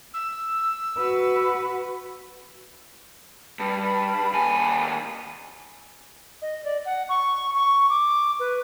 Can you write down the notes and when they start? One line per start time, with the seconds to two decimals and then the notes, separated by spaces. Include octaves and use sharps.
0.13 E6
0.98 F#4 B4
3.60 G2 A5 B5
4.33 D#2 G#5
6.42 D#5
6.64 D5
6.85 F#5
7.09 C#6
7.55 C#6
7.89 D6
8.40 B4